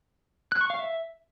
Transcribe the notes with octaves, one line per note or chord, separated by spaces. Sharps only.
F#6
C#6
F5
E5